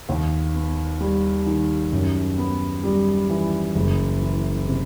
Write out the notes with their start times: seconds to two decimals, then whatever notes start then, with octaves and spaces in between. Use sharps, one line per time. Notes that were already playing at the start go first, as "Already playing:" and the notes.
0.09 D#2
0.55 B3
1.01 G3
1.46 D#3
1.92 F#2
2.38 B3
2.84 G3
3.30 E3
3.75 F#1
4.21 E3
4.67 C3